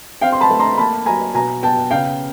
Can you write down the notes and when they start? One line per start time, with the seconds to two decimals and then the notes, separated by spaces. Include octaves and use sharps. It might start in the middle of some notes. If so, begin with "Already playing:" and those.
0.21 C4 F5 G5
0.32 C6
0.41 A5 B5
0.50 A3
0.59 A#5 C6
0.78 A#3 A5 B5
1.06 F#3 G#5 A#5
1.34 B2 G#5 A#5
1.63 B3 G5 A5
1.91 C#3 F5 G5